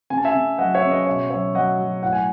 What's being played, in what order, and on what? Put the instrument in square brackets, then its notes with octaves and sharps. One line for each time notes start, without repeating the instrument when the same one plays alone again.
[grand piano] C#3 G#5
A5
E5 G#5
C#3
F#3 D#5 F#5
C#5 E5
C#3
B4 D#5
B2 C#5 E5
F#3 C#5 E5
F#3 D#5 F#5
F#3
A2 F#5
G#5